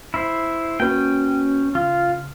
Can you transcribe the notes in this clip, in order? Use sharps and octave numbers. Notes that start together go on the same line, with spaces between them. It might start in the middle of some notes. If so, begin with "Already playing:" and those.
E4 C5
A#3 C#4 F#4 B4 G5
C#3 F4